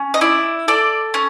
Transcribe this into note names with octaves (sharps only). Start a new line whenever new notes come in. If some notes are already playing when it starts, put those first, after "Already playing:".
Already playing: C#4
D#5
E4 D5
A4 D5
C#4